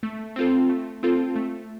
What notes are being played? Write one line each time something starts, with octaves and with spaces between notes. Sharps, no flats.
A3
C4 F4 A4
A3
C4 F4 A4
A3